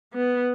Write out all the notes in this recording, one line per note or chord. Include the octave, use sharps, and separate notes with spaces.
B3